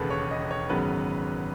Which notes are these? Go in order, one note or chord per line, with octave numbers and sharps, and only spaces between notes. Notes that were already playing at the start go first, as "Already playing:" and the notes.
Already playing: E1 D#2 C#3 A4 B4
C#5
D#5
C#5
G#1 F#2 C#3 F#3 B3 B4